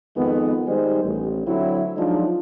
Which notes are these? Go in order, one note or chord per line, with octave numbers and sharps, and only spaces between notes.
F2 D#3 G#3 B3
D#3 G3 G#3 C5
A1
D3 F#3 C4 E4
F3 F#3 G#3 D4 D#4